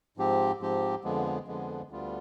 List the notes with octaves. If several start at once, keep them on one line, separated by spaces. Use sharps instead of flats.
G#2 F3 C4 G4
G#2 F3 C4 G4
F2 D3 F3 G#3 B3
F2 D3 F3 G#3 B3
D2 D3 G3 B3 F4